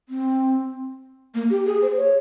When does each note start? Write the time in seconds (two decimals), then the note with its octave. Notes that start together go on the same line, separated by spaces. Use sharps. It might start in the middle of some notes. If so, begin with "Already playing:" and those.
0.09 C4
1.34 A#3
1.50 G4
1.66 G#4
1.82 C5
1.97 C#5